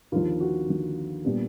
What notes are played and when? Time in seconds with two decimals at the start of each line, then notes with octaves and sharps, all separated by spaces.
0.12 D#2 D3 F3 F4
0.40 F#4
0.68 D#2 D3 F3
1.25 A#2 G3 B3 D4